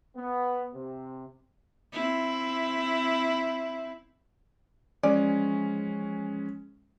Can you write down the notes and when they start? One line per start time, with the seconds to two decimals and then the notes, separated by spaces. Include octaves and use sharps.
0.16 B3
0.74 C3
1.93 C4 E4
5.03 F3 G#3 C#4 D5 G#5